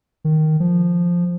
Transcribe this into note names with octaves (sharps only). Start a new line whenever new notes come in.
D#3
F3